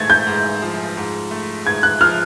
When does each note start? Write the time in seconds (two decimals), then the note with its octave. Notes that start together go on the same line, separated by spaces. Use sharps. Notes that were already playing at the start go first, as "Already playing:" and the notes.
Already playing: G#2 A3 G#6 A6
0.10 G6
0.27 G#2
0.62 F3
0.97 G#2
1.31 A3
1.66 G#2 G#6
1.83 F#6
2.01 F3 F6